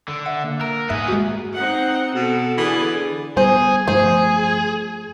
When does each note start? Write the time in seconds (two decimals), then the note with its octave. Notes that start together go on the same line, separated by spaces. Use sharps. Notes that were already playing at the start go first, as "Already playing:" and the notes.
0.08 D3
0.26 E5 F#5
0.44 A#3
0.61 A#4 E6
0.89 G#2 B3 G#4 E5 F#6
1.08 G#3 F#4
1.54 C4 D#4 F#5
2.15 B2 A4
2.57 D3 E3 G#4 D5
3.37 G3 B3 G#4 C5
3.88 G2 F3 A3 G#4 C5